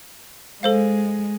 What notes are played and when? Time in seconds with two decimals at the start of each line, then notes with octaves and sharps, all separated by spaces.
0.63 G#3 A4 C5 F5